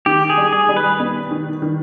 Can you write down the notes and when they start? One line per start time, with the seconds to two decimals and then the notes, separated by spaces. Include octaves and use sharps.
0.06 D#3 G4
0.29 G#4
0.37 G3
0.53 G#4
0.69 G3
0.77 B4
1.00 B3
1.31 D#3
1.62 D#3